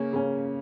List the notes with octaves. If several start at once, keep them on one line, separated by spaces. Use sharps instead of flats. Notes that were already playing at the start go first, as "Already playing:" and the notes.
Already playing: C#3 A#3 C#4
C#3 A#3 C#4